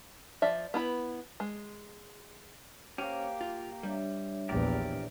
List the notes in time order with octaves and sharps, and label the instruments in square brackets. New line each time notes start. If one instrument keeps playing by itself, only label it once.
[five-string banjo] F3 D5 E5
B3 E4 B5
G#3
[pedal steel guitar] A#3 G4 [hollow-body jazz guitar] C#4 [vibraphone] C5
[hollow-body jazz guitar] F4 [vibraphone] F5
[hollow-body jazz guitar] G3 [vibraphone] D4 C#5 E5
[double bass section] A#1 E2 [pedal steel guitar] G4 A#4 D5